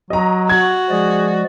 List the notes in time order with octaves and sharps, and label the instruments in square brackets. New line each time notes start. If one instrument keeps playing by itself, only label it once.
[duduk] F#3 [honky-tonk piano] D#5 A#5
[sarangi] F#4 [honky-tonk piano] G#6
[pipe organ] F3 G#3 D5 [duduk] G#4